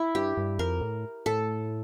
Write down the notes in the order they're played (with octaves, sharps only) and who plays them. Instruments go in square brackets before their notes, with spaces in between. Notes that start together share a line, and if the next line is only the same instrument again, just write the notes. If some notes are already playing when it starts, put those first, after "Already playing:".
Already playing: [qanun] E4
[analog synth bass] G2 [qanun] G4
[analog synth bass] G2
[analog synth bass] F2 [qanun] A#4
[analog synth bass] A2
[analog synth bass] A2 [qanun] A4